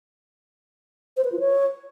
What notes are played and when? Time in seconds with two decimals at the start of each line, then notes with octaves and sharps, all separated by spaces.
1.17 C5
1.25 B4
1.32 F4
1.40 C#5